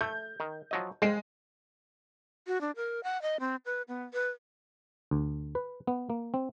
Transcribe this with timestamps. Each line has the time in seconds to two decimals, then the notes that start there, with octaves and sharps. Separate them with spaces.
0.01 A3 G6
0.40 D#3
0.71 F3 F#3 D#5
1.02 G#3 C5 F5 G5
2.47 F#4
2.61 D4
2.76 A#4
3.04 F#5
3.22 D#5
3.40 C4
3.66 B4
3.88 B3
4.13 B4
5.11 D2
5.55 B4
5.87 B3
6.10 A#3
6.34 C4